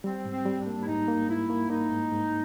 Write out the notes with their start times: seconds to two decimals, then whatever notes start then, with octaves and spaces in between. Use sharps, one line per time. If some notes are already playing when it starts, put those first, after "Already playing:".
0.04 G3 C4
0.25 G#2
0.32 C4
0.46 G3
0.59 D4
0.67 A#3
0.82 E4
0.87 G#2 D#4
1.08 A#3
1.29 G#2 E4
1.50 A#3
1.70 A#3 D#4
1.91 G#2
2.11 G#2